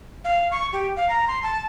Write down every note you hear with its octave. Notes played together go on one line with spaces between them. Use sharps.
F5
C#6
G4
F5
A#5
C6
A5